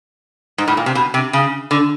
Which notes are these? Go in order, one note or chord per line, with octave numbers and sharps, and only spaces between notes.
G#2
A2
A#2
C3
B2
C3
C#3
D3